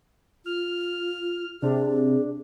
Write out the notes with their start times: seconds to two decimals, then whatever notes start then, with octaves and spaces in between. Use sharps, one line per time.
0.46 F4 F6
1.62 C3 D4 G#4